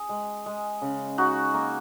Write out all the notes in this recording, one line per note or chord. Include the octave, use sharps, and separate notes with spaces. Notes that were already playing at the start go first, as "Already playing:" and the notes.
Already playing: G#4
G#3
G#3
C#3
D#4 F#4
A#3